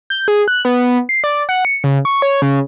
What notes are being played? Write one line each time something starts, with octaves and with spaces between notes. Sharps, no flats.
G6
G#4
F#6
B3
C7
D5
F#5
C#7
C#3
C#6
C#5
C#3